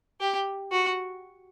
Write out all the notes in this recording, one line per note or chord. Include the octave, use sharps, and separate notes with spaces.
G4
F#4